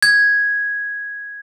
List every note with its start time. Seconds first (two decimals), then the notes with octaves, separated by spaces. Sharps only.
0.03 G#6